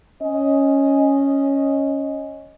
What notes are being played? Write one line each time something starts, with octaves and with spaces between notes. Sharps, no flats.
C#4 D#5